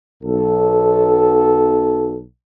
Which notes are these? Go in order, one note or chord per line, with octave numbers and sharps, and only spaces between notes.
B1 A4